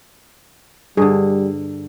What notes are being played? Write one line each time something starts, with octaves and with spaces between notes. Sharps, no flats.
G2 D3 G3 G#4